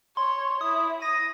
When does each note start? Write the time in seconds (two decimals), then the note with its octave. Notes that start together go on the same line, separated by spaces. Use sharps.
0.17 C#5 C6
0.61 E4 D#6
1.02 D#6 A#6